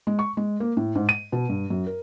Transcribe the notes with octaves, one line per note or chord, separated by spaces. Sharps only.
G#3
C#6
G#3
A#3
A2
G#2
D#7
B2
G2
F#2
A#4